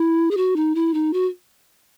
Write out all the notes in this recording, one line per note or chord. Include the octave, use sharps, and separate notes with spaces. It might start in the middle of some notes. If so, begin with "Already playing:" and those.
Already playing: E4
G#4
F#4
D#4
E4
D#4
F#4